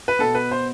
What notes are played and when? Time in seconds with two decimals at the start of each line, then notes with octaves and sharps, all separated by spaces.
0.08 B4
0.19 B2 B3 A4
0.35 B4
0.51 C5